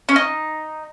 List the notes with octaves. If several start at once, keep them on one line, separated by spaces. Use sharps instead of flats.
C#4
D#4